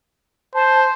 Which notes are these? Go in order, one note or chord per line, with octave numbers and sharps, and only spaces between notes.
C5 A5